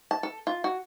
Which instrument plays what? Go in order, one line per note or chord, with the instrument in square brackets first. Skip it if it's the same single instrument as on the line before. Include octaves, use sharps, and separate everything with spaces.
[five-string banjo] A5
A4
F4
F#4